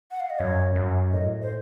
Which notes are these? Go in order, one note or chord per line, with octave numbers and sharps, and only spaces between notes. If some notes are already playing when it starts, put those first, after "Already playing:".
F#5
F5
D#5
F#2 C#5
F#2
A2 D#5
C5